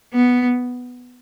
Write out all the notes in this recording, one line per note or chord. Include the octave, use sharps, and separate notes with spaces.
B3